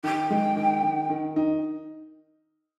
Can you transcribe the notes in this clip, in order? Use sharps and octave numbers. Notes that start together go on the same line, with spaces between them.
D#3 G5
G#3
D#3
D#3
D#3
D#4